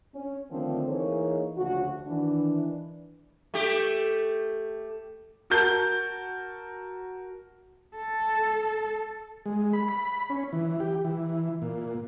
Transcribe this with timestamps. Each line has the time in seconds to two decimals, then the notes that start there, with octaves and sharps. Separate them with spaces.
0.15 C#4
0.51 D3 D#3 F3 A3 C4 D4
0.88 E3 A#3 D#4 G#4 C#5
1.57 D2 C#3 F3 F#4
2.07 D#3 E3 D4
3.54 A3 G4
5.50 F#4 A#4 A5 G6 G7
7.97 A4
9.46 G#3
9.73 B5
9.89 B5
10.30 C#4
10.53 E3
10.80 G4
11.04 E3
11.62 A#2